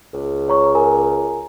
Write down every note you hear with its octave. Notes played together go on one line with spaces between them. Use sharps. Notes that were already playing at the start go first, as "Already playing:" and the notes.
C#2
C#5 A#5 C#6
A#4 G#5 A#5